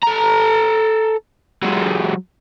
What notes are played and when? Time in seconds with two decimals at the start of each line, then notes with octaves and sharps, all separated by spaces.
0.03 A4 A#5
1.63 F#3 G#3